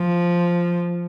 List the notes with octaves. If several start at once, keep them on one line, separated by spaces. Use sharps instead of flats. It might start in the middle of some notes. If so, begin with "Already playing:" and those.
Already playing: F3